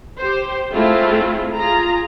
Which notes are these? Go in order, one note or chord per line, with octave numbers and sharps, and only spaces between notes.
G4 C5
G#3 A3 C4 E4 F4
F4 G#4 A#5